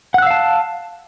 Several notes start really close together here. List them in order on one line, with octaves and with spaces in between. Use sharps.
F#5 F#6 E6 F5 A5